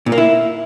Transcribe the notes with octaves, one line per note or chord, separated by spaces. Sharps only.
A#2
A#3
E4